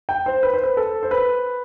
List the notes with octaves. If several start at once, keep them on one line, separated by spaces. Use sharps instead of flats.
G5
C5
B4
C5
B4
A4
C5
B4